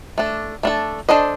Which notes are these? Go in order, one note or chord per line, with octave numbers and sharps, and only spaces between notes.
A3 D4 A4
A3 D4 A4
D4 A4 C5 D#5